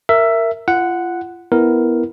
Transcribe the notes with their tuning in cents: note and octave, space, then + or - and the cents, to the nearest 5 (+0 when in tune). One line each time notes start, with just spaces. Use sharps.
A#4 -15 E5 +10
F4 -30 F#5 +0
B3 +0 E4 +0 A#4 +0